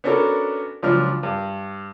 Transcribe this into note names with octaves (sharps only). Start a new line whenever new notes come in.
B3 C#4 D4 F#4 A4 A#4
C#2 F3 F#3 D4 F6
G2